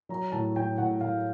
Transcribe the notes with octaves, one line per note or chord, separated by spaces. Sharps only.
F#3 A#5
A2 A5
A2 G5
A2 F#5
A2 F5